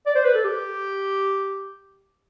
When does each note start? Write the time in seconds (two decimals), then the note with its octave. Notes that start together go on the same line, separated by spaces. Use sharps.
0.06 D5
0.16 C5
0.25 B4
0.34 A4
0.44 G4